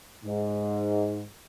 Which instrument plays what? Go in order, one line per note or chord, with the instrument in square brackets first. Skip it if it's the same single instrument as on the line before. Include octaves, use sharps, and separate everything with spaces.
[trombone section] G#2